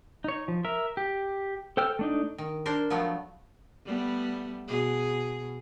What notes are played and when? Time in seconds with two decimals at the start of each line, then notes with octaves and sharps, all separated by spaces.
0.24 D#4 C#5
0.48 F3
0.65 A#4 E5
0.97 G4
1.77 A4 C5 G5 E6 F6
1.99 A3 D4 D#4
2.38 D#3
2.66 D4 A#4 C5
2.90 F3 F#3 A3 B3
3.86 G3 A3 B3
4.68 B2 G#4